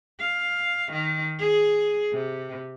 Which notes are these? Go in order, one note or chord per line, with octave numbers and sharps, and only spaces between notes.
F5
D#3
G#4
C3